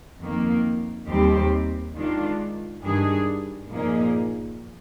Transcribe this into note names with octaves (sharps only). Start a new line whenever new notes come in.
F2 D#3 A#3
D#2 D#3 G3 C4 G4
D#3 G#3 D4 F4
G2 D#3 G3 D4 G#4
A#2 F3 A#3 D#4 G#4